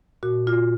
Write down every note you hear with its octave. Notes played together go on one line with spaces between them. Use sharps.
A#2 F#4
A#2 F4